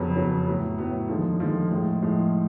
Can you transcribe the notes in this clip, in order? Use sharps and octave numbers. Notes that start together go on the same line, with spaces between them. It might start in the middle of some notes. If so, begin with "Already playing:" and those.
Already playing: F2 C#3 F#3 B3
F2 C#3 F#3 B3
A2 F#3 B3
A2 F#3 B3
D#2 D3 F3 G#3
D#2 D3 F3 G#3
A2 F3 G#3
A2 F3 G#3